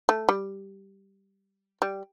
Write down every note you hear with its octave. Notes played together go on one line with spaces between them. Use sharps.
A3
G3
G3